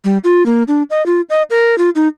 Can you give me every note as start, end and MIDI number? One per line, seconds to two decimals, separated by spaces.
0.05 0.18 55
0.24 0.45 65
0.46 0.63 58
0.68 0.83 62
0.90 1.04 75
1.06 1.21 65
1.30 1.42 75
1.50 1.78 70
1.78 1.90 65
1.95 2.07 63